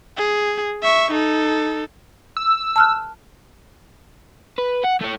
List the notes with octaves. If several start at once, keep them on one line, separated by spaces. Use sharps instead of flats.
G#4
E5 C#6
D#4 A4
E6
A5 F6 F#6
B4
F#5
A3 C#5